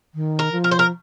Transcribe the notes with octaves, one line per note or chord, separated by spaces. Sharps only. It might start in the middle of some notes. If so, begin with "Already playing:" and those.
D#3
A#4
F3
A#4
C5
A#4